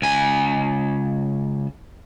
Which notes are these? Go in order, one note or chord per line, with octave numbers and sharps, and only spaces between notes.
C#2 G#5